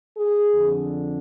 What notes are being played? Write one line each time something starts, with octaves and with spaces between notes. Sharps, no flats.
G#4
F2 D3